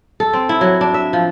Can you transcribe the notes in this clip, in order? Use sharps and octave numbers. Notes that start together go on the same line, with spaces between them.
A4
C4
E4
F#3
D4
E5
F3